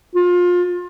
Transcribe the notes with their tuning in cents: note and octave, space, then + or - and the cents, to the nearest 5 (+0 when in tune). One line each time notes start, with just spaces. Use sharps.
F4 +25